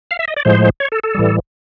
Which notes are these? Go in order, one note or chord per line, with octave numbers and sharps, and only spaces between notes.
F5
E5
D#5
D5
A2 F3 G#3 C5
C#5
A4
A4
A2 E3 G3